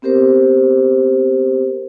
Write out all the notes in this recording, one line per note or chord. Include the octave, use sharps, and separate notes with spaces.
B3 C4 G4 A#4 C5